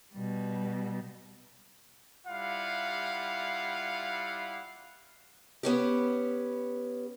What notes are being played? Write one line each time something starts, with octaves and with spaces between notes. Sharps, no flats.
B2 G3
G3 E4 F4 F5 F#5
B3 C#4 G4